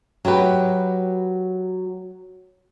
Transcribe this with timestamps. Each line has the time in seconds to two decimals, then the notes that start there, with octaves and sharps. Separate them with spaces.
0.25 F#3 F#4 G4 B4